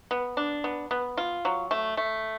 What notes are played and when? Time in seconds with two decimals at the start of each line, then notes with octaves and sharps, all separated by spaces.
0.11 B3
0.37 D4
0.64 B3
0.91 B3
1.17 F4
1.45 F#3
1.71 A3
1.97 A3